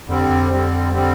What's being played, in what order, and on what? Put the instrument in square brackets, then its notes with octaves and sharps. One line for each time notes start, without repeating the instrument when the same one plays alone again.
[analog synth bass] F2 [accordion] D3 G3 C4
[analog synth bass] F2
[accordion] D3 G3 C4
D3 G3 C4